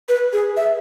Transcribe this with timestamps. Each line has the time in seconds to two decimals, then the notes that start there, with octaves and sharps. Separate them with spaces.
0.09 B4
0.33 G#4
0.57 E5